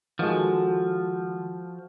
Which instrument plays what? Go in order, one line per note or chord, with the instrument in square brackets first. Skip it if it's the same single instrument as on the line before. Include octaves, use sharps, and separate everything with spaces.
[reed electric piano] D#3 G#3 [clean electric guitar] F3 [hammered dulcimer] F#4 A4